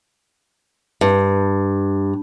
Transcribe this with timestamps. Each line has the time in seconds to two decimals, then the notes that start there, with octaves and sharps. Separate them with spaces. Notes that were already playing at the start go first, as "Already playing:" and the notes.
1.01 G2